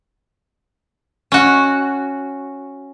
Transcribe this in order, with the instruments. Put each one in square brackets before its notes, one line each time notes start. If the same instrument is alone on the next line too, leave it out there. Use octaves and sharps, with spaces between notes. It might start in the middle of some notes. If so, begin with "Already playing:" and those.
[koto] C#4 F#4